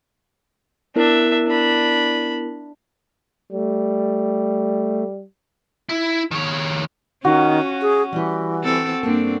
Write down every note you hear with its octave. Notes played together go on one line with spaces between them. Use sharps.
B3 D4 E4 A#4 E5
D4 B5
G3 A3
E4
D#3 C#5
D#3 C#4 F4 F#4
G#4
E3 G3 G4
C4 A4
G2 A#3 C4 D4 A4